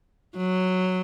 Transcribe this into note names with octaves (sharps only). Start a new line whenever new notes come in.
F#3